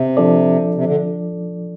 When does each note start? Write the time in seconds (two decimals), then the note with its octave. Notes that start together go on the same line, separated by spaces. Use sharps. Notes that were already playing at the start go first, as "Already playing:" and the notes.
Already playing: C3
0.17 F3 D4 A4 D5
0.74 C3
0.85 D3